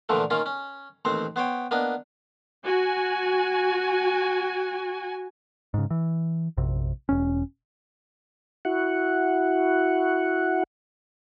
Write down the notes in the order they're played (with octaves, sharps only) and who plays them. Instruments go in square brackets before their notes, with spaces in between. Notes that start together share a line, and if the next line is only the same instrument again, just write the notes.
[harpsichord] A#2 D3 E3 F3 A3
D#3 A#3 C#4 F4
C#4
A1 D#2 C4 C5
B3 C5 C#5 G5
A#3 B3 D4 D#5
[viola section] F#4 G#5
[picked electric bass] G#2 C#3
E3
A#1 F#2 C3
E1 C#4
[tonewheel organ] E4 F#4 F#5